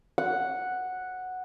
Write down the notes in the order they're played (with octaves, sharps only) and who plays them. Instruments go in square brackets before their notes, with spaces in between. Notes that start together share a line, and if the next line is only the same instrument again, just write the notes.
[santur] F#5